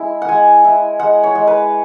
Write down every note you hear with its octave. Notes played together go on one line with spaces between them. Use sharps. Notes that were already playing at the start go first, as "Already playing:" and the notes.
Already playing: G#3 E4
F#5
G#3 G#5
E4
G#3 F#5
C#5
G#3
B4